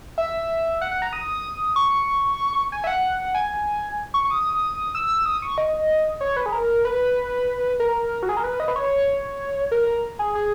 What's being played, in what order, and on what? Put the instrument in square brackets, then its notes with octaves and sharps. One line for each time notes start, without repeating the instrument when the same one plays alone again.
[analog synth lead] E5
F#5
F#5
A#5
D#6
C#6
G#5
E5
F#5
G#5
C#6
D#6
E6
D#6
C#6
D#5
C#5
B4
G#4
A#4
B4
A#4
F#4
G#4
A#4
B4
D#5
B4
C#5
A#4
A#4
G#4
G#4